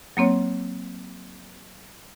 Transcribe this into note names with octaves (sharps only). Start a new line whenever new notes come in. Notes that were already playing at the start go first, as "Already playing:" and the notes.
F#3 A#3 C4 C#5